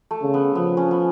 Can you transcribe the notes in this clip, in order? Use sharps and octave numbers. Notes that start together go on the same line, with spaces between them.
A3
C#3
B3
F3 B3
C#4
B3